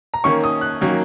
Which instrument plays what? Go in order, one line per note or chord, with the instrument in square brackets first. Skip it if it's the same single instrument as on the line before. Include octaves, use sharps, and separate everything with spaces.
[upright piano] A#5
D#3 A#3 C#4 C#6
D#6
F#6
D#3 F#3 A#3 C#4